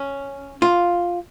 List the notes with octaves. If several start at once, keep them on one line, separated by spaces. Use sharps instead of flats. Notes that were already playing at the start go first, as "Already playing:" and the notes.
Already playing: C#4
F4